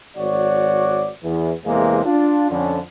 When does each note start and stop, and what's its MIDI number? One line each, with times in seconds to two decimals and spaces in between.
0.17 1.09 32
0.17 1.09 66
0.17 1.09 73
0.17 1.09 74
1.24 1.53 40
1.66 2.01 40
1.66 2.01 48
1.66 2.01 52
1.66 2.01 56
1.66 2.01 58
2.06 2.48 62
2.06 2.48 65
2.51 2.79 41
2.51 2.79 50
2.51 2.79 61